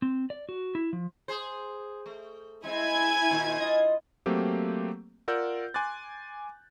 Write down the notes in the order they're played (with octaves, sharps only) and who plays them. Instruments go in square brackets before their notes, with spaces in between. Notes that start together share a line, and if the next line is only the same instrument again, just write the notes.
[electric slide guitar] C4
D5
F#4
E4
F3
[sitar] G#4 C5
A3
[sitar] G#3 C4 [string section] E4 G#5 G#6
[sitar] A#2 D#3 C4
G2 F4 D#5
[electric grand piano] F#3 A3 A#3 C4 G4
F4 A#4 D5 F#5 E6 G6
G#5 C6 D6 F#6 A6